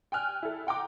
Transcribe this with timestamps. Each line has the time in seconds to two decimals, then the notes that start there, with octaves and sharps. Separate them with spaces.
0.12 G5 G#5 F6 F#6
0.43 E4 A4
0.67 F#5 G5 A#5 D6